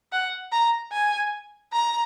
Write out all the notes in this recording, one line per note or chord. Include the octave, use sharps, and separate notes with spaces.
F#5
A#5
G#5
A#5